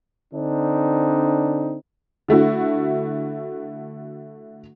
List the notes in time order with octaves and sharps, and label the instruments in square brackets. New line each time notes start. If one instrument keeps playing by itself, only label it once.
[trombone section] D3 C4 D4 D#4
[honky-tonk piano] D3 A3 E4 F#4